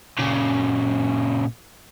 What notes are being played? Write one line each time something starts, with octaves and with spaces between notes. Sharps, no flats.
A#2 C#3